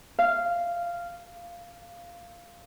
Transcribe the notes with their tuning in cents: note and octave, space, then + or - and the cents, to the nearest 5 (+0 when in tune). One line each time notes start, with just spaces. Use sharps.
F5 -10